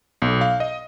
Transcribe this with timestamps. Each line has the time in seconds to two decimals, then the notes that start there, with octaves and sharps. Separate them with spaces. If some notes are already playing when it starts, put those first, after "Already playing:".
0.22 B1
0.41 F5
0.60 D#5